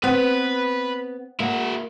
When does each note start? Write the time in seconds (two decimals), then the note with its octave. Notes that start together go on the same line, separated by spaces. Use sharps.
0.04 B3 C4 B4
1.40 A#3 E4 F#4